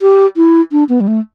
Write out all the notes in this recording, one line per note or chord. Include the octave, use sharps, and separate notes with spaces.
G4
E4
D4
B3
G3
A3